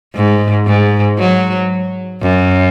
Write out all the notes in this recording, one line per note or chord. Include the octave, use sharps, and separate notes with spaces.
G#2
G#2
F#3
F#2